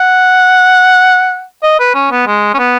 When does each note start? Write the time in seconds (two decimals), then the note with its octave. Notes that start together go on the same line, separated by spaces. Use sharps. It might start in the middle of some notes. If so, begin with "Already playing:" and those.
Already playing: F#5
1.63 D#5
1.80 B4
1.95 C#4
2.11 B3
2.27 G#3
2.54 C#4
2.59 B3